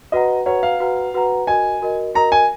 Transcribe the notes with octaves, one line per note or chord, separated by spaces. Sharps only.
F#4 B4 D#5 F#5 A#5
F#4 B4 C#5 F#5 A#5
F5
F#4 B4 F#5 A#5
F#4 B4 F#5 A#5
F#4 A#4 D#5 G#5
F#4 A#4 D#5
F#4 A#4 D#5 A#5
G#5